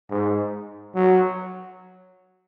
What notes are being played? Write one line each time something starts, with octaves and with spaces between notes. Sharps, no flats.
G#2
F#3